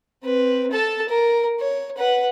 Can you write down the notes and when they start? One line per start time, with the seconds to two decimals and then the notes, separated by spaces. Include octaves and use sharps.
0.23 C4 B4
0.71 A4 A5
1.09 A#4
1.60 C#5
1.97 B4 F#5